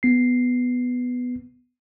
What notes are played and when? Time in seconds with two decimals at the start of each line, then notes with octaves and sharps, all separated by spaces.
0.03 B3 C7